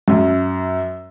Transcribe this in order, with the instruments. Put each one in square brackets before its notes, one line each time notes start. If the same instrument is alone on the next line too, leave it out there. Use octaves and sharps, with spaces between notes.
[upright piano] F#2